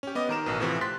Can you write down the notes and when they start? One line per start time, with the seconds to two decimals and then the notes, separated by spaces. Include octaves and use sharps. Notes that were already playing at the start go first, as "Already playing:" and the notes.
0.03 C#4 G4
0.15 B3 D#5 D6
0.29 D#3 A#4 E7
0.46 A1 B2
0.60 A2 C3 E3 F3
0.81 C6 F#6 A6 B6